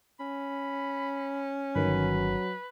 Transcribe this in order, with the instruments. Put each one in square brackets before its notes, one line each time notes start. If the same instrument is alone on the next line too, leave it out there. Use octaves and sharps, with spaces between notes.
[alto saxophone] C#4 [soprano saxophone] B5
[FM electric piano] G1 D#3 [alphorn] F#3 [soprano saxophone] B4